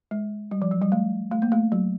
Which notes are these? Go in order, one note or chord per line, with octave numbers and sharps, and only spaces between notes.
G#3
G3
F3
F#3
G3
A3
A3
A#3
A3
F#3